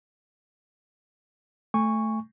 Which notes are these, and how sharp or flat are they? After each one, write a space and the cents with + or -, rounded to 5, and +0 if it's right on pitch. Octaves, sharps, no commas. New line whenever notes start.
A3 +0 G#5 -25 C#6 +0